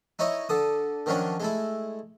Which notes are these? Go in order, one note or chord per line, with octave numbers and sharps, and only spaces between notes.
D#4 E4 C#5 D#5
D3 A4 D#6
D#3 F3 F#3 C#4 D4
G#3 A3 E4